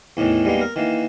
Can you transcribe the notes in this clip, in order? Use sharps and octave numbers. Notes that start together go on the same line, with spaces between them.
E2 A2 D#3 E3
G3 G#3 A#3 B3 D#4
A#4
D#3 E3 A#3